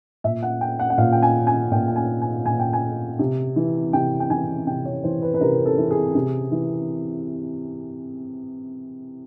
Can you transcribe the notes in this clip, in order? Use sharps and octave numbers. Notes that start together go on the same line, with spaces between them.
A#2 E5
F#5
G5
F#5
F#5
A#2 F5
G5
G#5
G#5
A#2 G5
G5
G#5
G#5
A#2 G#5
G5
G#5
C3
E3
C3 G5
G5
E3 G#5
C3 G5
C#5
E3 C5
B4
B4
C3 A#4
A4
E3
G#4
C3
E3